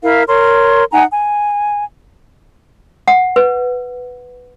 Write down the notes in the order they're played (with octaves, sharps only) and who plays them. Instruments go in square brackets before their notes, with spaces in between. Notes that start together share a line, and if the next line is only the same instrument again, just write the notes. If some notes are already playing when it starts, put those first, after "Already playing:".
[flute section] E4 A#4 F5
A#4 C#5 C6
D#4 F#5 G#5 A#5
G#5
[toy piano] F#5
B4